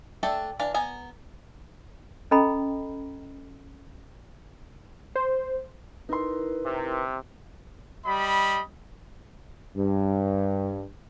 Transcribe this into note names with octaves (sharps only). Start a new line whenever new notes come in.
A3 D4 A4 E5 G5
E3 D4 F5 B5
B3 G#5 A#5
C#4 A4 D#5 G5 A#5 B5
C5
D#4 E4 A#4 B4 C6
C3
G3 D#5 B5
G2